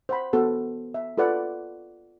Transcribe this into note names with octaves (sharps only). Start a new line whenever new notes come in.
C5 F#5 B5
B3 F#4 A4
E5
F4 A4 B4 D5 F#5